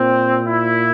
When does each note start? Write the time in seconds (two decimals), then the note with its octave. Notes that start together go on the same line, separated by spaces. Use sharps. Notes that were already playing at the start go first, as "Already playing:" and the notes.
Already playing: A#2 C4
0.48 E4